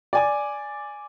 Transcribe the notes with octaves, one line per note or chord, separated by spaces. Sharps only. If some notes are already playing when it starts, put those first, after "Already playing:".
D5 G#5 D6